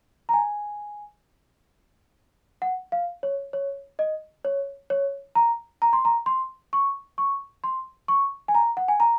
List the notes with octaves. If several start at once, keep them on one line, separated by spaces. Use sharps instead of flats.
A#5
G#5
F#5
F5
C#5
C#5
D#5
C#5
C#5
A#5
A#5
C6
A#5
C6
C#6
C#6
C6
C#6
G#5
A#5
F#5
G#5
A#5